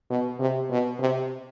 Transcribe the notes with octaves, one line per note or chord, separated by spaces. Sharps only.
B2
C3
B2
C3